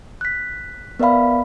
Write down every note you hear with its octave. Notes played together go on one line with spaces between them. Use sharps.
F#6 B6
B3 A#4 D5 E5 F5 B5